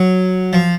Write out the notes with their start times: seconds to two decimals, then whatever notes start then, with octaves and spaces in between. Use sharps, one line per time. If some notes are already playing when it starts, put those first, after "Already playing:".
Already playing: F#3
0.53 F3